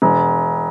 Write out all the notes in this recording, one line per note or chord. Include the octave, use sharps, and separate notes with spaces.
E1